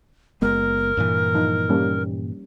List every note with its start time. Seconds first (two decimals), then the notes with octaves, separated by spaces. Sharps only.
0.42 F#1 G#3 B3 A#4
0.97 G2 A#2 E3
1.34 F3 D#4
1.69 G3 A#3 C#4